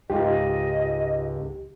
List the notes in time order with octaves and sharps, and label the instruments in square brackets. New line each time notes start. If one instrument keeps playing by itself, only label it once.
[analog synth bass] C#2 [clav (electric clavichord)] G#2 F4 [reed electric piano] G4 [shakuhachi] D#5